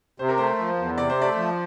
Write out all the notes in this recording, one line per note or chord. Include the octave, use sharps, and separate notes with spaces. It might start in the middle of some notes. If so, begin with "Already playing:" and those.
C3 C5
A#4
A3 C5
F3
E2
C3 D5
C5
A3 D5
F3